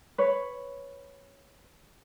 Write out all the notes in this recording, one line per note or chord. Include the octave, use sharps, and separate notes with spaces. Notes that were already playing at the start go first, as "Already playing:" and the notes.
B4 C#5